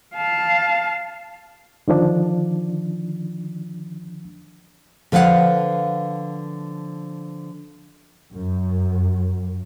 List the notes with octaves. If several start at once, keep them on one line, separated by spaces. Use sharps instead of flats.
F5 A5
D3 D#3 F3 D4
D3 F3 B4 F5 F#5
F#2